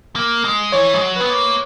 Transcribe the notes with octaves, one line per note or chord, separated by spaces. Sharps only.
A#3
G#3
E3 C#5
G#3
F#3
B3 B4
A#3